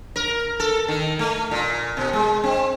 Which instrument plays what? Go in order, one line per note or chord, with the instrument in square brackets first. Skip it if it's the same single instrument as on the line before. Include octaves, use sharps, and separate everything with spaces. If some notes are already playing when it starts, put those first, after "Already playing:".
[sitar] A#4
A4
D#3
A3
A#2
B2
G#3
C4